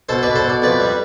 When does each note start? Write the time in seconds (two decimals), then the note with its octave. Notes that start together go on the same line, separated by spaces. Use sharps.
0.09 B2 A4 C5
0.23 B2 B4 D5
0.35 A4 C5
0.44 B2
0.49 D5
0.62 F2 B4 D5
0.80 G3